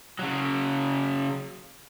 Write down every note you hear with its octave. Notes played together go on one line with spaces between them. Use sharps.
C#3 F#3